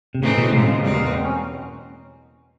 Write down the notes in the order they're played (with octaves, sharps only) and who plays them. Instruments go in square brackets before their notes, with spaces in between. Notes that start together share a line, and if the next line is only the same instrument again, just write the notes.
[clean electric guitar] C3
[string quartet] A2 E3 A3 C4 D#4 [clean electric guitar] C#3
[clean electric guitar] B2
[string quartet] A2 F3 G#3 [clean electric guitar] C3
[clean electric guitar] C#3
C#3
[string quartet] E2 B2 G#3 C4 D#4 [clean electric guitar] G3
[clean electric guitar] A#3
B3
C4
C#4